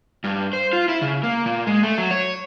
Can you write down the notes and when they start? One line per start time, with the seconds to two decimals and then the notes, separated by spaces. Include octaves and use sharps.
0.24 G2
0.53 C5
0.73 F4
0.89 E4
1.02 C#3
1.23 A#3
1.46 A#2
1.67 G#3
1.83 A3
1.98 F#3
2.11 C#5